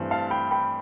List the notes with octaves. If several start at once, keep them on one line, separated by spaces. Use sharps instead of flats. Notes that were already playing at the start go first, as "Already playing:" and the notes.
Already playing: G2 E3 A3 C4
F5 A5
G5 B5
G5 B5